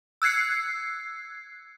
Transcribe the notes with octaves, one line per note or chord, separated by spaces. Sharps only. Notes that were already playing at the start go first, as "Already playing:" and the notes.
E6 F#6 G#6 C7 C#7